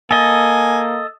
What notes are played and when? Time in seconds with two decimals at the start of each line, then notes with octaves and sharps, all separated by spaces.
0.11 A#3 A4 D#5 G#5